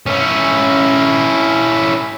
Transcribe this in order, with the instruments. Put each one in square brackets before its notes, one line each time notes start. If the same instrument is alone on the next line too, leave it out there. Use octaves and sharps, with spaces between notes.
[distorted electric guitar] C#4 E4